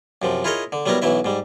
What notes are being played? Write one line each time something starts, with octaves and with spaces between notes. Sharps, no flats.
F#2 C3 F3
E4 F4 G#4 A#4 C#5 D#5
D3
F#3 G3 B3 D4 E4 A#4
B1 E3 F#3 E4 E5
G#2 G3